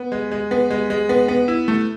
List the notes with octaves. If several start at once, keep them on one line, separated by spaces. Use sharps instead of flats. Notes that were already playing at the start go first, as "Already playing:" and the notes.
Already playing: B3
G#3
G#3
B3
G#3
G#3
B3
B3
E4
A3